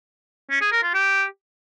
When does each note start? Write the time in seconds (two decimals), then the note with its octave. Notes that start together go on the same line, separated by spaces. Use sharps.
0.50 C#4
0.61 G#4
0.72 A#4
0.83 F4
0.94 G4